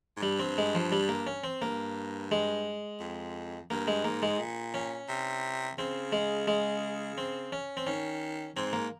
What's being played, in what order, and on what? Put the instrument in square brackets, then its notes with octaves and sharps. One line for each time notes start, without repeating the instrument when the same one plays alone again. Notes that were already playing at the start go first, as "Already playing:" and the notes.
[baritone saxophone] G#2
[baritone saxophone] G2 [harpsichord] G3
[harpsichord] C4
G#3
F3
G3
A#3
C#4
C4
[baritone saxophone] G2 [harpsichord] A#3
[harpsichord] G#3
[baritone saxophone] F2
[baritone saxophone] G2 [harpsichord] A#3
[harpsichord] G#3
[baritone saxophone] G#2 [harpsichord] A#3
[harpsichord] G#3
[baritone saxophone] A#2
[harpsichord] C#4
[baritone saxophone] C3
[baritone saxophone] C#3 [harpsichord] C4
[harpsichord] G#3
G#3
C4
C#4
C4
[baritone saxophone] D#3 [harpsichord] C#4
[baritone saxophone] G#2 [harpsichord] C4
[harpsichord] A#3